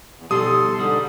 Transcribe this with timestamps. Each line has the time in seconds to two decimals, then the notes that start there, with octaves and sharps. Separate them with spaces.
0.19 E2
0.31 B2 G3 G4 A4 C6 D#6
0.79 G#2 D3 G3